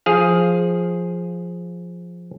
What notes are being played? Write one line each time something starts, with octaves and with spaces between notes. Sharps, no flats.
F3 G#4 F5